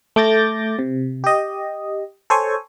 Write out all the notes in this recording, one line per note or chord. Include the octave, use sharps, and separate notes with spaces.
A3 D6 G6 A6 A#6
C3
G4 D#5
A4 C5 C#5 G#5